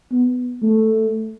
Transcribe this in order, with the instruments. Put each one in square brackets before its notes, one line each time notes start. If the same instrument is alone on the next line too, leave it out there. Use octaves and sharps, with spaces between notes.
[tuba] B3
A3